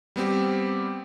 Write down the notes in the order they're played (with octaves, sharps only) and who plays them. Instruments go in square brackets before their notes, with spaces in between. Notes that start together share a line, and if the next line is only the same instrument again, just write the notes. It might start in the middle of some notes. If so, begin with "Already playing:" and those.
[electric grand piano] G3 B3 C4 G4